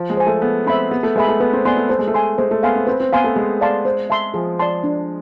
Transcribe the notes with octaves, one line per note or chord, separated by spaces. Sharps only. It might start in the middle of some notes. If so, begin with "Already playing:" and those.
Already playing: F3
G#3
C5 G#5
A3
B3 A4
C4 E5 B5
B3 G#4
A3
G#3 B4 E5 G#5 B5
A3
B3 B4
C4
B3 D5 G#5 C6
A3
A3 C5
G#3
A3
G#5 C6
G#3 C5
A3
B3 F5 G#5 C6
C4
C4 B4
C4
B3 F5 G#5 C6
A3
G#3 G#4
D5 F5 A5 C6
C5
E5 A5 C6
F3 G#4
D5 A5 C6
D4